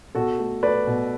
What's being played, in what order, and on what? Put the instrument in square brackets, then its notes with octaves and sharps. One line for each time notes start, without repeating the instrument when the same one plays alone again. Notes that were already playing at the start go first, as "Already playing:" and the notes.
[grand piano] B2 F#4 A4
A3
A3 B4 D5
B2